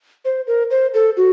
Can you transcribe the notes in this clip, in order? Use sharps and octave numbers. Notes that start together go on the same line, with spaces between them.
C5
A#4
C5
A4
F#4